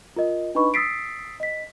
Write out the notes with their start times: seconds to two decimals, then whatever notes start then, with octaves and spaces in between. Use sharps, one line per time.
0.16 F4 A#4 D#5
0.55 D4 D#4 B4 D#5 B5 C#6
0.74 D#6 E6 A6 B6 C7 D7
1.40 D#5 B6